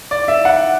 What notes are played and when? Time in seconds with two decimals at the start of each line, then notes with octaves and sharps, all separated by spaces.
0.11 D5
0.28 E5
0.45 F#5